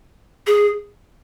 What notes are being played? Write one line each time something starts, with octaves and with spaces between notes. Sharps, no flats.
G#4